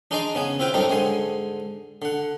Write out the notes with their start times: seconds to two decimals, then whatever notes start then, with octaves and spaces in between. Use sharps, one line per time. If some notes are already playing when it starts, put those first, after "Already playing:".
0.11 D4 D#4 G#4 D5 D#5 C6
0.35 C#3 B3 G#5
0.59 C4 E4 F4 B4 G5
0.74 F#2 A2 G3 C4 D4 D#4
0.90 G#2 D3 G#5 C6
2.02 D3 F#5